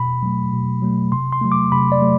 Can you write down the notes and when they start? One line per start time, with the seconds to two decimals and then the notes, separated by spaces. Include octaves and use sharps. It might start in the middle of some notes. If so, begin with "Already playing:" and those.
Already playing: B2 B5
0.23 F#3 A3
0.53 B2
0.82 F#3 A3
1.12 C3 C6
1.33 C6
1.41 F#3 A3
1.52 D6
1.72 C3 B5
1.92 D5
2.02 F#3 A3